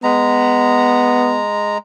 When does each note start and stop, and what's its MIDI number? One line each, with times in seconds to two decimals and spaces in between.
0.03 1.78 56
0.03 1.42 59
0.03 1.78 82